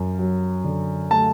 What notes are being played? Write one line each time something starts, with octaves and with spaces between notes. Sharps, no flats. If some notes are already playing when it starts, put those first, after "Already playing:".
Already playing: F#2
F#3
D3
A3 A5